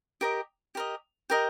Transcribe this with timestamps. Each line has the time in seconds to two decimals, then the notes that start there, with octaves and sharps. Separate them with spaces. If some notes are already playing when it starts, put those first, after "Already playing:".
0.21 G4 A#4 D#5
0.75 G4 A#4 D#5
1.30 G4 A#4 D#5